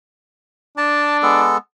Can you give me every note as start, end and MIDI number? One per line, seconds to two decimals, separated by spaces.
0.78 1.47 62
0.78 1.17 81
1.23 1.57 56
1.23 1.57 59
1.23 1.57 69